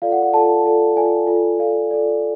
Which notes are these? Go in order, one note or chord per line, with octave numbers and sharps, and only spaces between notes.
F4 A4 D5 F5
F#5
F#5
F4 A4 D5 A5
F4 A4 D5
F4 A4 D5 G#5
F4 A4 D5
F4 A4 D5 F5
F4 A4 D5